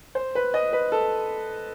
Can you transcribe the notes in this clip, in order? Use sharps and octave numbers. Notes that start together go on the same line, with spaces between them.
C5
B4
D#5
B4
A4